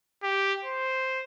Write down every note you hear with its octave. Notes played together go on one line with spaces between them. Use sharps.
G4
C5